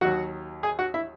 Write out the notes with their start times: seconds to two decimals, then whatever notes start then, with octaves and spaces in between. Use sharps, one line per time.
0.01 D#2 D#3 F#3 F#4 F#5
0.63 G#4 G#5
0.79 F#4 F#5
0.94 E4 E5